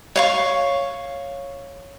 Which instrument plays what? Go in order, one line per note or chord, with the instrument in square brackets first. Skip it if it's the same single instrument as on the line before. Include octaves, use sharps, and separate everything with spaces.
[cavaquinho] C#5 F5 C#6